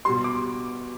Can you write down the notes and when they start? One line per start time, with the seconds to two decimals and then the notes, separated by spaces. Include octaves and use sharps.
0.05 B2 G3 C6
0.24 D6